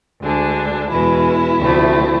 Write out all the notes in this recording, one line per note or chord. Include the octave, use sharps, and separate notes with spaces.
D2 D3 G#3 D4
E2 B2 G#3 E4
D2 C3 F3 A3